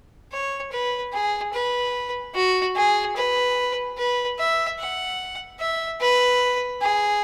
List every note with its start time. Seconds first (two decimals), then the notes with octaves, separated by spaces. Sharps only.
0.32 C#5
0.72 B4
1.13 G#4
1.53 B4
2.35 F#4
2.76 G#4
3.16 B4
3.98 B4
4.39 E5
4.79 F#5
5.60 E5
6.01 B4
6.82 G#4